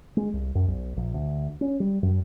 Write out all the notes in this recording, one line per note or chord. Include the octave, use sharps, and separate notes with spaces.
G#3
C2
F#2
B1
A#1
D2
C#4
G3
F#2